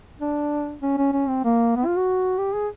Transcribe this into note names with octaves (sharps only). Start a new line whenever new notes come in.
D4
C#4
C#4
C#4
C4
A#3
B3
F4
F#4
G4
G#4